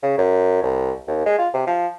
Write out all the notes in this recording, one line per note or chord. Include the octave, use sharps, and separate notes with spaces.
C#3
F#2
C2
D#2
G#3
F4
C3
F3